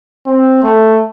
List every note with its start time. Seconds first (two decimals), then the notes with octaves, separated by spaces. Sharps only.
0.26 C4
0.63 A3